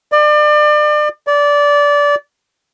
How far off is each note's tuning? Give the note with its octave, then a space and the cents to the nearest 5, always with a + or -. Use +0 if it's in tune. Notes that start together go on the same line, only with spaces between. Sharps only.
D5 +35
D5 -20